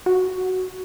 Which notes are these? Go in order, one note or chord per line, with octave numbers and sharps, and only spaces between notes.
F#4